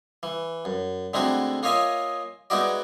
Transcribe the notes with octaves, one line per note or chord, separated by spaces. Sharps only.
E3
F#2
D3 G#3 A3 C4 E4 F#4
A#3 F4 C#5 D#5 E5 G#5
G#3 B3 D#4 E4 F#4 D5